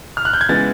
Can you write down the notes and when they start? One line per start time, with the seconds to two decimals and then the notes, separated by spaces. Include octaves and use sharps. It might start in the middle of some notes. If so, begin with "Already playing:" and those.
0.17 F6
0.25 F#6
0.33 G6
0.41 G#6
0.49 C#3 E3 G#3 B3 A6